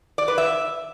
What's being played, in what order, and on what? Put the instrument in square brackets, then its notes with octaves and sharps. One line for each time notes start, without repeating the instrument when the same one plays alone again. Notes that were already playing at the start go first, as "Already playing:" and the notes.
[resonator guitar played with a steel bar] D5
B4
E5